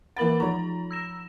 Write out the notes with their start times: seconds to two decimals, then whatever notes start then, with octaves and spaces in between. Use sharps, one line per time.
0.17 E3 A#3 F#5 B5 A6 F#7
0.40 F3 D#4 F4 A#5
0.91 E6 A#6 E7